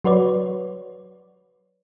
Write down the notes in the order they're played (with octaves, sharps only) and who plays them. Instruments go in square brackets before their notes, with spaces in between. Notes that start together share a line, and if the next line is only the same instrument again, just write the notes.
[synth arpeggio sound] F#3 F#4 B4 C#5 D5